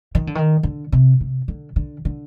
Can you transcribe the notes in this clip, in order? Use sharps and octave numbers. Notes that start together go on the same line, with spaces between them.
D#3
D3
D#3
D3
C3
C3
D3
D3
D3